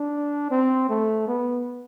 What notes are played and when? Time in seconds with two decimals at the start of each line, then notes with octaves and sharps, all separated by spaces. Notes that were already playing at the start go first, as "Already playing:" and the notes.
Already playing: D4
0.51 C4
0.89 A3
1.27 B3